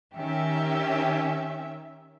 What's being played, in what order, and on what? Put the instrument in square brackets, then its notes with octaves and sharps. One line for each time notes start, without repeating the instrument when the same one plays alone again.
[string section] D#3 C#4 G4 E5